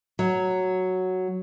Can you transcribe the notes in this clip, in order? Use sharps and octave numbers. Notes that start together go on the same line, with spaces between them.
F#3